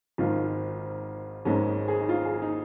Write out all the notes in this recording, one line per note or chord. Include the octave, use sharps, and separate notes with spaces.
G#1 G#2 D#3 F4
G#1 G#2 G#3 C#4
G#4
D#4
F4
G#4
D#4